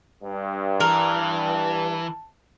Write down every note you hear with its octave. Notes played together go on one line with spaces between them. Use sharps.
G2
E3 A#4 A5